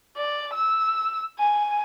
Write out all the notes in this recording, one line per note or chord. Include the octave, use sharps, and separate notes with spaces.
D5
E6
G#5